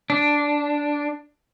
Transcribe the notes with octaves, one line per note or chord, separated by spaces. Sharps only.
D4